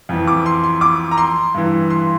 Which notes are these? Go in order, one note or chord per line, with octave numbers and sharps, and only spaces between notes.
F2 E3
D6
C6
C6
D6
A#5
C6
G2 E3
C6